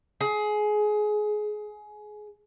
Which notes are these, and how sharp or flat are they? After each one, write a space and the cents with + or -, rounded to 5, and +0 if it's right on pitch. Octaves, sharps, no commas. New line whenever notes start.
G#4 +20